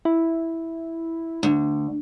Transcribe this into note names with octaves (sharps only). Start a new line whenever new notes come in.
E4
D2